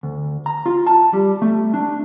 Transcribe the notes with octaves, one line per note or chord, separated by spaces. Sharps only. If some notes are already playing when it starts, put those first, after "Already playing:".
D2
A#5
F4
A5
G3
A3
D4